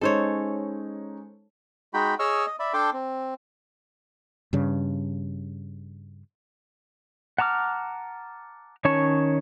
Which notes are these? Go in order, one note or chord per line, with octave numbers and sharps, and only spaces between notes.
G#3 C#4 D#4 A4 C5 C#5
G#3 D#4 F#4 G5 B5
G#4 C#5 D#5 C#6 E6 F6
D#5
D5 E5 B5
D4 A4 G5 C6 D6
C4
G2 C#3
F#5 A5 A#5 D6 F6
D#3 C#4 C#5 A5 C#6